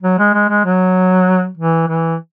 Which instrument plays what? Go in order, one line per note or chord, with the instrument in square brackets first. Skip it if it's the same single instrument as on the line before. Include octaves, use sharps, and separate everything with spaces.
[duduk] F#3
G#3
G#3
G#3
F#3
E3
E3